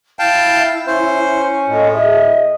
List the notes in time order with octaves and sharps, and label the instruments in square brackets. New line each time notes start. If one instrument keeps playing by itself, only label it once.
[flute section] E4 [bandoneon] F5 G5 A5
[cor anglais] C#4 [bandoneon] C5
[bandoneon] A2 [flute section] F4 A4 D#5
[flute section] G#4 E5 [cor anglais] D#5